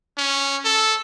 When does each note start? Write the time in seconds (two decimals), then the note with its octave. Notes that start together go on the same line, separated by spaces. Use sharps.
0.17 C#4
0.65 A4